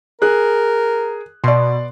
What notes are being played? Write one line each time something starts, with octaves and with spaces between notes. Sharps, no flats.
G#4 A#4 F#6
B2 D5 C6